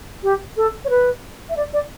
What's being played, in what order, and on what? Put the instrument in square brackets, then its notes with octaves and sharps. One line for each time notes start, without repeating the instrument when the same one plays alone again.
[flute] G4
A4
C#5
B4
E5
D5
D5